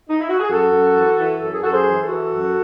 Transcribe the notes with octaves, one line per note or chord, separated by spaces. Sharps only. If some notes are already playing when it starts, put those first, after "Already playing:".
D#4
E4
F#4
G#4
F#2 F#4 A4
F#2
E3
E3
F#2 A4
G#4
F#2 F#4 A4
G#4 C5
E3
F#4 A4
E3
F#2